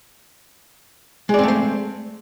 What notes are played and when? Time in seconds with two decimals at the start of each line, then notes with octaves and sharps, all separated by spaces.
1.29 G#3
1.34 D5
1.39 C4
1.43 A3
1.48 C5